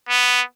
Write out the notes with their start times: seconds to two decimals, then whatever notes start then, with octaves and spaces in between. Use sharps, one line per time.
0.09 B3